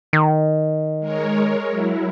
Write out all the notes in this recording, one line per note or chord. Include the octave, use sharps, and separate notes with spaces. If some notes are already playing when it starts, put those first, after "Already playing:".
D#3
G#3 A#4 C#5
F#3 E4